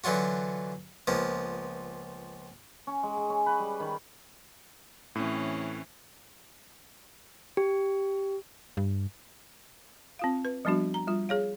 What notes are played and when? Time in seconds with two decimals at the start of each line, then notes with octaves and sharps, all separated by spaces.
0.04 D3 E3 F#3 F4 F#4
1.07 C#2 F3 A#3 B3
2.87 C#4
3.03 G#3
3.17 G#4
3.30 C#4
3.46 B4
3.59 G3
3.80 D#3
5.15 A2 E3 C4 C#4
7.57 G4
8.77 G2
10.19 C4 F4 F5
10.45 B4
10.65 F3 G3 B3 D4 F#4
10.94 A#5
11.07 G3 F4
11.29 G#4 C#5 F5